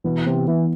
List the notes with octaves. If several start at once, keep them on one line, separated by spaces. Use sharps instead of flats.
B2 E3
C3 B3
E3 B3